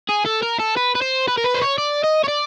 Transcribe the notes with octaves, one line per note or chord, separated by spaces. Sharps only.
G#4
A4
A#4
A4
B4
B4
C5
B4
A#4
B4
C5
C#5
D5
D#5
C#5
D5